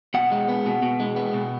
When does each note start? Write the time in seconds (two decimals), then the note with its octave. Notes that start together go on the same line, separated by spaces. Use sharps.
0.14 B2 F#5
0.32 G#3
0.49 B3
0.66 B2
0.82 B2
1.00 G#3
1.16 B3
1.34 B2